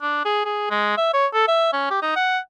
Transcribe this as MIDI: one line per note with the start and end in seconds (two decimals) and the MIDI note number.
0.01 0.21 62
0.25 0.42 68
0.45 0.69 68
0.70 0.94 56
0.98 1.13 76
1.14 1.27 73
1.34 1.47 69
1.48 1.72 76
1.73 1.88 61
1.91 1.98 67
2.02 2.12 63
2.16 2.39 78